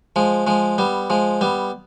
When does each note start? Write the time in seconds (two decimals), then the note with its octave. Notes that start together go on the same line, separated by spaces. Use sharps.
0.16 F3 G#3
0.47 F3 G#3
0.78 G3 B3
1.10 F3 G#3
1.41 G3 B3